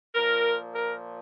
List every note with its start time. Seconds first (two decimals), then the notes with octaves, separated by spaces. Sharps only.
0.15 A#2 F3 A#4
0.75 A#4